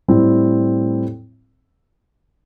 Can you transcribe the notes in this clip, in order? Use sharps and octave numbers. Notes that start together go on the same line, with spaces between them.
A2 G3 C4 E4